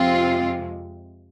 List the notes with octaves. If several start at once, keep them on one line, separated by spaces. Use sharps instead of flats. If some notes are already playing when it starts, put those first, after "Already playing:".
Already playing: F2 C3 G#3 C4 F4